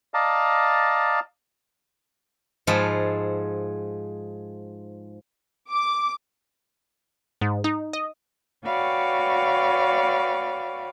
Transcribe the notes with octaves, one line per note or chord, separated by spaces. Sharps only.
D5 D#5 F5 A5 A#5
G#2 F3 G#4 A4 B5
D6
G#2
D#4
D#5
F#4 B4 C#5 D5 F5 G5